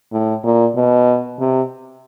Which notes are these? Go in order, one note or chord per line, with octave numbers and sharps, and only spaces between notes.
A2
A#2
B2
C3